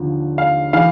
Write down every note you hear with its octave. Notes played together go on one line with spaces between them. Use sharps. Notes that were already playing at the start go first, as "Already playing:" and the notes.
Already playing: D#2 D3 F3
F5
E3 F5